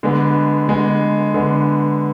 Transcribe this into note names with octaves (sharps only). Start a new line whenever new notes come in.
D3 G#3 B3
D3 G#3 B3
D3 G#3 B3